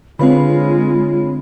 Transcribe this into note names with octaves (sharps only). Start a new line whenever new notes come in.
D3 G#3 C4 F4 B4 C#5 F5 B5